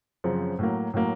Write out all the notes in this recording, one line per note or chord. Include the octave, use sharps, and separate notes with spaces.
F#2 C#3 F3 C4
A2 F#3 A#3
A2 F#3 A#3